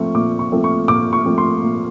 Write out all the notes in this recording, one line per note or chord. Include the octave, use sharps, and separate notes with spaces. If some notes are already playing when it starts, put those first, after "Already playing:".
Already playing: F3 A3 C4 C#6
A#2 D6
C#6
F3 A3 C4
C#6
A#2 D6
C#6
F3 A3 C4
C6
A#2